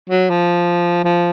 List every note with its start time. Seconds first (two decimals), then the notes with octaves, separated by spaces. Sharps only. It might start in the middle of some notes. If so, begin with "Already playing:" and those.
0.10 F#3
0.30 F3
1.04 F3